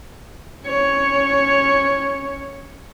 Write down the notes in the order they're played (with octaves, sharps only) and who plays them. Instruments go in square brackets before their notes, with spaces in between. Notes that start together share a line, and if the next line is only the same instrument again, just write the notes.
[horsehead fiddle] C#4 C#5